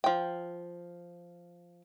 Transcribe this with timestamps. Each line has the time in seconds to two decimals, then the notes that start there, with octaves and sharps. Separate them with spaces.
0.04 F3 G5